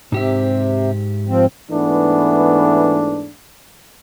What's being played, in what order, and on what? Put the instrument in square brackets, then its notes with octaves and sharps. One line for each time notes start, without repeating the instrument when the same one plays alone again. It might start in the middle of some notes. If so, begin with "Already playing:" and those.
[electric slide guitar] G#2 G4 E5 [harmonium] C3
[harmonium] F3 C4
[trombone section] G#2 E3 A3 B3 D4